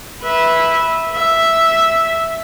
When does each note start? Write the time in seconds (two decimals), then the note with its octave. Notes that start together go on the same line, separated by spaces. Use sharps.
0.22 B4 E5
1.14 E5